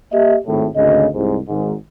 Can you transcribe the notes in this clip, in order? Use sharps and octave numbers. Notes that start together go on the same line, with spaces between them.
A#3 G4 D#5 E5
G#1 A2
G#1 D2 C#3 D#5
C2 G#2
G#1 G#2